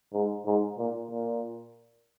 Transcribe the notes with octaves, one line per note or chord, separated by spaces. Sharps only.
G#2
G#2
A#2
A#2